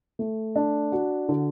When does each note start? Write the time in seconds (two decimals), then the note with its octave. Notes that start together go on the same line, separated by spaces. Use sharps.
0.19 A3
0.56 D4
0.92 F#4
1.29 D3